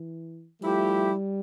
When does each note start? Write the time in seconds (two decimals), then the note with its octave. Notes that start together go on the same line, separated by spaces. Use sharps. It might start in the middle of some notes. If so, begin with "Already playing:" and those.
Already playing: E3
0.62 F3 G3 A3 E4 G4